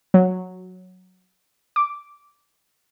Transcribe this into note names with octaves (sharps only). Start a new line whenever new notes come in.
F#3
D6